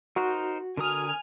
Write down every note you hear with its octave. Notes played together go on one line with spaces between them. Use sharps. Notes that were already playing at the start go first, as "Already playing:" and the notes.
D#4 F#4 A#4 C5
D3 A#4 G#5 D#6 F6